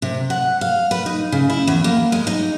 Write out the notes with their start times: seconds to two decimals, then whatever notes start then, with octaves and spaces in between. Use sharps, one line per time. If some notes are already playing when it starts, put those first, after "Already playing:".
0.02 C3
0.30 F#5
0.61 F5
0.91 B4
1.06 D#4
1.32 C#3
1.50 E4
1.67 E2
1.84 A#3
2.12 G#3
2.27 D#4